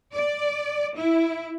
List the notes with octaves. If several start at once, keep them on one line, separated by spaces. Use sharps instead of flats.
D5
E4